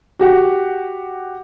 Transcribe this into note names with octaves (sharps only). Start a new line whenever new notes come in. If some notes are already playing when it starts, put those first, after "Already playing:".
F#4 G4 F#5